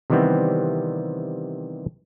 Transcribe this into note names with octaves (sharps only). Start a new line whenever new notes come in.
C3 D#3 E3 G3 B3 C4